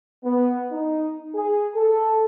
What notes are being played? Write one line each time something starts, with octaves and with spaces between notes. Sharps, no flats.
B3
D#4
G#4
A4